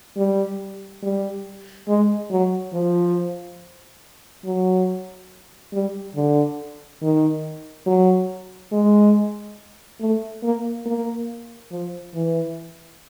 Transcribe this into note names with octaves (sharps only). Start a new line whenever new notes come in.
G3
G3
G#3
F#3
F3
F#3
G3
D3
D#3
F#3
G#3
A3
A#3
A#3
F3
E3